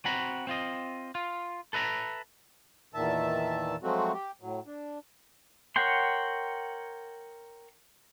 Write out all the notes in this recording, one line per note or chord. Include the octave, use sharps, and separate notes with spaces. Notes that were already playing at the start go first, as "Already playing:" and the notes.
C4 F#4 F#5 A#5 B5
C4 F4 D#5
F4
A4 B4 E5 A#5
E2 A#2 D#3 E5 A5
F3 F#3 G#3 A3 C4 F#4
G4
A2 F#3
D4
A#4 C#5 F#5 G5 C6